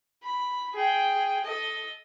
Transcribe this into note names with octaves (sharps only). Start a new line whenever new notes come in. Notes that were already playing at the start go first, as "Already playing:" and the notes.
B5
G#4 G5
A4 D#5